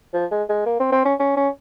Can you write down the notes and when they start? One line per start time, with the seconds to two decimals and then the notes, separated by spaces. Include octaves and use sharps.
0.13 F3
0.31 G#3
0.49 G#3
0.66 A#3
0.80 C4
0.92 C4
1.05 C#4
1.19 C#4
1.37 C#4